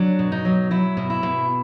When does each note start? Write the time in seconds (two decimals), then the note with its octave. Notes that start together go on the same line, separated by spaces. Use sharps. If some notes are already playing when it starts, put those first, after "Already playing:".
Already playing: F#3 D4
0.19 B2
0.32 D#4
0.45 F#3
0.71 F#3 E4
0.97 B2
1.10 E4
1.23 B2